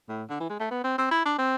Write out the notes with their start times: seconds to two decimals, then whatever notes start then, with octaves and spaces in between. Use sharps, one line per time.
0.09 A2
0.30 D3
0.40 E3
0.50 G#3
0.60 A3
0.71 B3
0.84 C4
0.98 C4
1.11 E4
1.25 D4
1.39 C4